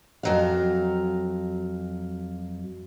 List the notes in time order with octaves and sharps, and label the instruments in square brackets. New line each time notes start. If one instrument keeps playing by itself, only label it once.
[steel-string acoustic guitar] F2 F#3 F5